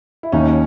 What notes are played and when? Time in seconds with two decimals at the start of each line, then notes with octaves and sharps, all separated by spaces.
0.23 E4
0.32 D#2 C#4 D#4